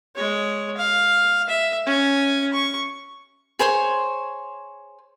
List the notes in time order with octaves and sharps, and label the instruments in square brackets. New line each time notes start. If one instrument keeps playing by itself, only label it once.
[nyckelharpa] G#3 C#5
F5
E5
C#4 G#5
C#6
[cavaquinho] G#4 C5 C#5 C6